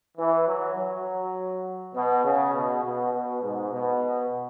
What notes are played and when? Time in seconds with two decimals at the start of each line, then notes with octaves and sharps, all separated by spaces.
0.18 E3
0.47 F#3
0.76 F#3
1.95 B2
2.24 C#3
2.54 B2
2.83 B2
3.12 B2
3.42 G#2
3.72 B2